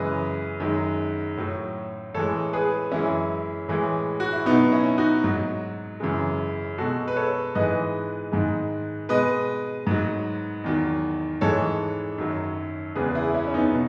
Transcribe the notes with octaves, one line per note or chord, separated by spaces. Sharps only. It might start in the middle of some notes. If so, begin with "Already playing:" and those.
Already playing: F#2 C#3 E3 G#3 B4 D#5
F#2 D#3 G#3
A2 F#3
A2 E3 G#3 A4 C#5
G#4 B4
F#2 E3 G#3 C#4 E4
A2 E3 G#3
F#4
E4
B2 F#3 B3 D#4
C#4 E4
D#4 F#4
G#2 F#3
F#2 C#3 E3 G#3
B2 G#3 F#4 A4
B4
A4 C#5
G#2 E3 G#3 B4 D#5
G#2 D#3 G#3
B2 G#3 B4 D#5
G#2 F#3
E2 D#3 F#3
G#2 E3 G#3 A4 C#5
F#2 D#3 F#3
E2 C#3 G#3 G#4 B4
E4 G#4
C#4 E4
C#4
B3 D#4
B2